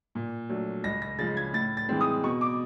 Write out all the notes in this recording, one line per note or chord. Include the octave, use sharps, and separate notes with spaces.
A#2
F#3 A3 D4
C#2 A#6
A#6
C#3 F3 G#3 A6
G#6
A2 A6
A6
E3 G#3 C4
D#6
B2 C#6
D6